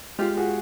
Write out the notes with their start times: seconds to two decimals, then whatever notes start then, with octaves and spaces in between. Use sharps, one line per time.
0.19 G#3 F4 G4
0.37 F4 F#4 G#4